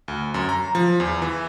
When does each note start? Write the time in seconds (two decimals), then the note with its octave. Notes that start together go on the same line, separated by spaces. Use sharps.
0.08 D2
0.34 F#2
0.49 A#5
0.75 F3
1.00 E2
1.22 E3